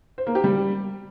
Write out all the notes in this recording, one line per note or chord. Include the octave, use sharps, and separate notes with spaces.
C5
A#3
G4
G3